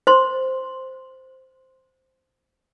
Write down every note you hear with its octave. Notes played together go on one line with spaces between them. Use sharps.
C5 C6